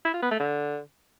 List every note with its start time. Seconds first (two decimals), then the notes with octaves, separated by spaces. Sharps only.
0.05 E4
0.14 F4
0.22 B3
0.31 A3
0.40 D3